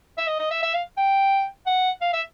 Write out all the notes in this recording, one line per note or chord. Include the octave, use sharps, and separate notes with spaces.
E5
D#5
D#5
E5
E5
F5
G5
F#5
F5
E5